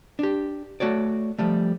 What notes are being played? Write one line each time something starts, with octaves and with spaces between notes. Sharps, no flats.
D4 G4
A3 F#4 C#5 D5
F3 G3 A3